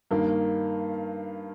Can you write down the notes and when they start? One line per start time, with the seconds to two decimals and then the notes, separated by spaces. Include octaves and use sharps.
0.11 G2 D#3 A#3